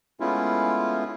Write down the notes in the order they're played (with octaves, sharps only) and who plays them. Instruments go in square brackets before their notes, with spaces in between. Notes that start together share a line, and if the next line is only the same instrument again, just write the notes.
[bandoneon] G#3 A3 B3 C#4 E4 F4